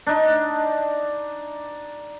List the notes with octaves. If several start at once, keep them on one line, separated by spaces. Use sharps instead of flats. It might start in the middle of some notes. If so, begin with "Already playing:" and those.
D4 D#4